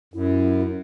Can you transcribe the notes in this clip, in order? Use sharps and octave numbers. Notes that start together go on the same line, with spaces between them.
F#2 E4